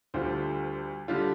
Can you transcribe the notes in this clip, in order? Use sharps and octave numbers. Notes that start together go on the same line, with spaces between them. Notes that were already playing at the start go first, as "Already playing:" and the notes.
D2 D3 G3 F4 C5
D3 G3 F4